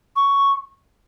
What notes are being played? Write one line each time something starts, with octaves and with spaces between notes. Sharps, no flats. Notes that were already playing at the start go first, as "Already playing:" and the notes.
C#6